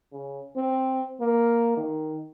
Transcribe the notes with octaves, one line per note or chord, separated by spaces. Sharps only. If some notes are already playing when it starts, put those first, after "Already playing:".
C#3
C4
A#3
D#3